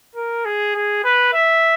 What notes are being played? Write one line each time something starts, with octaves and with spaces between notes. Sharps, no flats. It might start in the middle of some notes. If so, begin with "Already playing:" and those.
A#4
G#4
G#4
B4
E5